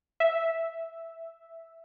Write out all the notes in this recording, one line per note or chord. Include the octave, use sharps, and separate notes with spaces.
E5